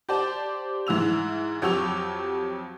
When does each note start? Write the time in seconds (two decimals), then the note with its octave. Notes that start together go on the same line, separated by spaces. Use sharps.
0.09 G4 C5 D5 A5
0.87 G#2 E3 E6 F7
1.62 F2 F#3 G4 C#6 E6 F7